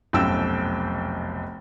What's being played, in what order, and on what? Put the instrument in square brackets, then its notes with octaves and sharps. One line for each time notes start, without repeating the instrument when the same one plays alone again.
[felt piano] F1 B1 F#2 G5 E6 E7